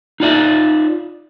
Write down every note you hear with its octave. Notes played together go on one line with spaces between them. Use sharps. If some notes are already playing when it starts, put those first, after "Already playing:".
D#4 F4 D5 E5